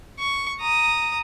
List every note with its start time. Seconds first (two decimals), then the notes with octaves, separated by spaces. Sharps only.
0.19 C#6
0.60 A#5 D#6